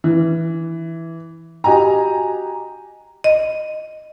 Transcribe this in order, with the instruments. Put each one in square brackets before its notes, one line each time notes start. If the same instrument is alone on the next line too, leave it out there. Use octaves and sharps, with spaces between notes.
[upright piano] E3
F#4 G4 D#5 G#5 A#5
[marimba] D#5